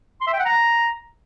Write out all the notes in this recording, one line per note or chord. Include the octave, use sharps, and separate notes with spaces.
C6
E5
G5
F#5
A#5